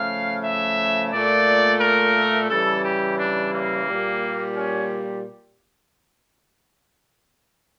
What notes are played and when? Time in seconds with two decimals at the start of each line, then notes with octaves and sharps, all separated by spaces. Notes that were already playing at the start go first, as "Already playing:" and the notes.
Already playing: C#3 F3 A3 F5
0.44 E5
1.12 A#2 A3 D5
1.81 A#4
2.49 C#3 E3 G3 A4
2.84 G4
3.18 D4
3.52 A#3
3.88 A#2 G3
4.56 C#4